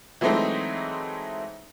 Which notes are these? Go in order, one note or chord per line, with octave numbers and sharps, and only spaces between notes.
E3 F#3 G#3 A3 C4 D#4